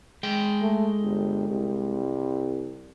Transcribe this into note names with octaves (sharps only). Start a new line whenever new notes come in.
G#3 G5
A3
G1
C2